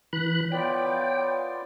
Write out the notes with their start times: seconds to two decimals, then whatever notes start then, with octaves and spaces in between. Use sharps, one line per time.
0.13 E3 B5 F#6
0.52 B3 F4 C#5 D5 G5